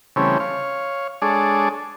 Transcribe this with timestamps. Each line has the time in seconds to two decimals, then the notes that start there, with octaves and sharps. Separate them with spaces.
0.16 C#3 E3 G3 A3 C4 C#4
0.40 C#5 F5
1.22 G#3 D4 G#4 A4 C#5 D5